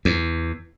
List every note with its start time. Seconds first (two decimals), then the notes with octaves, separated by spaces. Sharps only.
0.05 E2